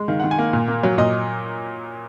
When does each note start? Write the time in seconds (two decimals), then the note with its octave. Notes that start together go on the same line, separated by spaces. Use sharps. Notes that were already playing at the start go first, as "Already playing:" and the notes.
Already playing: G#3
0.08 D#3 F5
0.20 F#5
0.24 D#3
0.31 G#5
0.38 A#3
0.53 A#2
0.68 A#3
0.83 F#3
0.98 A#2 D#5